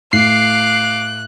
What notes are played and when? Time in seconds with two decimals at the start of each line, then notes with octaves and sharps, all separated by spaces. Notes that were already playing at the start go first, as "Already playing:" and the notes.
0.13 A2 F5 D6 F#6 C7